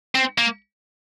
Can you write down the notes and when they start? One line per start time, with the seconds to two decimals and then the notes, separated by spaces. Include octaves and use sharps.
0.15 C4
0.38 A#3